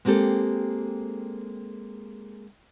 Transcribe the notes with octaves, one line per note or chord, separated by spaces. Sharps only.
G#3 A#3 C4 G4 A4